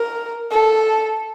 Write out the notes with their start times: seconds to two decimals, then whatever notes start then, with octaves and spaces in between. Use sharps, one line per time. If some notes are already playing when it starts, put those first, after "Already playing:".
Already playing: A#4
0.52 A4